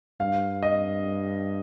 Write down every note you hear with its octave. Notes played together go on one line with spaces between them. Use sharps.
G2 F5
D#5